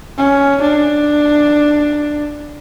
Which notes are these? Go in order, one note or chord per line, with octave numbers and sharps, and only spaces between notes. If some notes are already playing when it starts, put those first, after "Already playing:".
C#4
D4